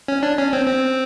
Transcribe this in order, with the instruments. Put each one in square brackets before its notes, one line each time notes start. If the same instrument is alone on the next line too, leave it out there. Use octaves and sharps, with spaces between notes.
[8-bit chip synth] C#4
D4
C#4
C4
C4